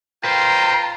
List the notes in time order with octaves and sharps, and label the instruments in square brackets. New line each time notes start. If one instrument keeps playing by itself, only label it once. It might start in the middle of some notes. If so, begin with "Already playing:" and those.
[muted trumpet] F4 [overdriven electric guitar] B4 C5 [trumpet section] G5 [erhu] A#5